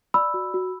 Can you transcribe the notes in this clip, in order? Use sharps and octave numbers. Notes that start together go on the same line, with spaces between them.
D5 B5 E6
F#4
F#4